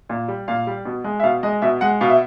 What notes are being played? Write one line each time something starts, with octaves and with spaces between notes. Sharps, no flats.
A#2
G3
A#2 F5
G3
B2
G#3
E5
B2 F5
G#3 D#5
B2 E5
G#3 F#5
B2 F5
E5